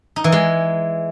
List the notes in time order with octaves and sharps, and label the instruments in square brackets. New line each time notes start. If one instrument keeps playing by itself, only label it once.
[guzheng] D#4
E3
G#3